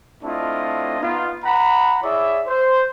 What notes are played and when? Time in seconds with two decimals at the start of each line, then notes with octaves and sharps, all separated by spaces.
0.23 A3 C4 D4 E4 F4 D#5
1.01 B3 D#4 F4
1.44 F#5 A#5 B5
2.03 E4 G#4 C#5 D5 E5
2.47 C5